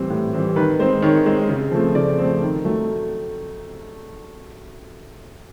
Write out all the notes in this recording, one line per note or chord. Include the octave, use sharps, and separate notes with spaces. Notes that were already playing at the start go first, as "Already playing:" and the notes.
Already playing: A2 E3 G3 C4
A2
E3 G3 C4
D#3 B4
G#3 C4 C5
D#3 C#5
G#3 C4
C#3
F3 A3 C4
C#3 D5
F3 A3 C4
D#3
F#3 A3